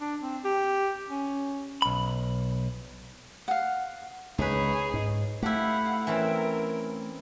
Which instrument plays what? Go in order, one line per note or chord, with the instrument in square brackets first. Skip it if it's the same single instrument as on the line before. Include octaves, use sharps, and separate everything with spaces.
[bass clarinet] D4
C4
G4
C#4
[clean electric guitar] B1 B5
[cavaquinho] F5 F#5
[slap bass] C#2 [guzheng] D#4 B4 [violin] G#4 C#5
[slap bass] G#2
[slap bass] A3 [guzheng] E4 G4 [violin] F5 F#5
[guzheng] E3 C4 C#4 [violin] A#4